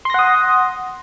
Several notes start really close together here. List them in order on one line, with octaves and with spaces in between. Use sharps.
C6 A#6 F#5 D#6